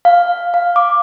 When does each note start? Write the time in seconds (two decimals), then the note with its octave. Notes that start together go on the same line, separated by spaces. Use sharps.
0.05 F5
0.54 F5
0.76 D6